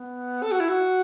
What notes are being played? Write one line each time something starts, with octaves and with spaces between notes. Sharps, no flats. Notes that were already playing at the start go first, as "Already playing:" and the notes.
Already playing: B3
A4
F#4
E4
F#4